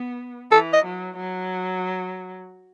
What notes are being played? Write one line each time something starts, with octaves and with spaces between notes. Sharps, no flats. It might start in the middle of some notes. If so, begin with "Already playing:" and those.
Already playing: B3
E3 A4
D#5
F#3
F#3